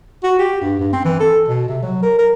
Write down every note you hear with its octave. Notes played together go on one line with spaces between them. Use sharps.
F#4
G4
G2
G2
C4
E3
A4
B2
C3
F#3
A#4
A#4